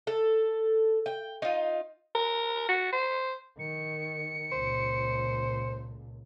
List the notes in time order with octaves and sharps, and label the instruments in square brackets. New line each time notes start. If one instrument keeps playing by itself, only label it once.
[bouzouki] A4
G5
D#4 F4
[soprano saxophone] A#4
F#4
C5
[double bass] D#3 [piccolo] C#7
[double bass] C#2 A#2 [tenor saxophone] C5